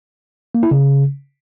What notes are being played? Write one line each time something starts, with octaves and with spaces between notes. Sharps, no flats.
A#3
E4
C#3